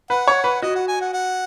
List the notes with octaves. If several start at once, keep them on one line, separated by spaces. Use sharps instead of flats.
B4 F#5
C#5
B4
F#4 D#5
F#5
G#5
F#5
F#5